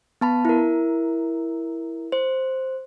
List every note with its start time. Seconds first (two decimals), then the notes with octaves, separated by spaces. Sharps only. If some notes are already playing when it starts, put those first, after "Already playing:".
0.21 B3 A5 B5
0.45 E4 A#4
2.12 C5